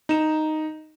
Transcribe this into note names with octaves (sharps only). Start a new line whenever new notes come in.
D#4 E7